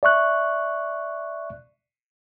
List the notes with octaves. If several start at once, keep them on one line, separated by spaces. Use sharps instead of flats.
D5 E5 C#6 F#6